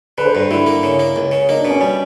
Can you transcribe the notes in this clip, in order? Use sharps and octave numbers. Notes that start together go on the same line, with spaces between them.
D3 B4
C5
G2 B4
D3 E4
A#3
C#3
A#3
C#2
C#3
A#3 D#4
D4
B2 C#4
G3